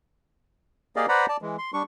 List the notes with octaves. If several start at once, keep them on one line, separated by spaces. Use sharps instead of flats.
A#3 G4 G#4 D5 D#5 F5
B4 C5 D5 F#5 A#5 B5
D5 A5
E3 G#3
C6
G3 D4 C#6